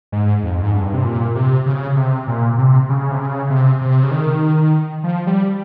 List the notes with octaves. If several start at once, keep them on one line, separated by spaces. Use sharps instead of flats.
G#2
F2
G#2
G2
C3
A#2
C3
C#3
C3
A#2
C3
C#3
C3
C#3
C3
C3
C#3
D#3
F3
G3